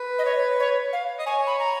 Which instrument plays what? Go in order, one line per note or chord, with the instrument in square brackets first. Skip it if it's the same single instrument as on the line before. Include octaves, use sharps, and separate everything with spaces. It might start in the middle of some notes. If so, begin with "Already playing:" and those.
Already playing: [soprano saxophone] B4
[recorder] D#5
C#5
C#5
F5
[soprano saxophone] D#5
[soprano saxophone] C#5 [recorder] G#5
[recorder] B5
A#5